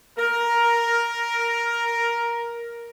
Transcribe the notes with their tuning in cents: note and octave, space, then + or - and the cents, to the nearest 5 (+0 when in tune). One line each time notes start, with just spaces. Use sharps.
A#4 +10